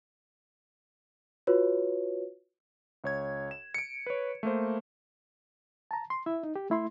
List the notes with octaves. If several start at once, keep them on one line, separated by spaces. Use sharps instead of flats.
F4 F#4 B4 C#5
C#2 C#5 G#6
E7
C#7 D7
B4 C#5
A3 A#3 C5
A5 A#5
C6
E4 E5
D#4
G4
A3 E4 C6